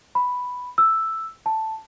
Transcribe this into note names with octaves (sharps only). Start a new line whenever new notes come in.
B5
E6
A5